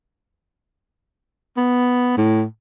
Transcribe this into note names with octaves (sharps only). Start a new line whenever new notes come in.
B3
A2